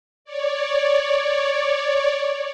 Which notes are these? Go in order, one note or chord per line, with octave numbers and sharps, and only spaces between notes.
C#5 D5